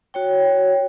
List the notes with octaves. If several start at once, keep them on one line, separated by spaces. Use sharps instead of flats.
F#4 C#5 G5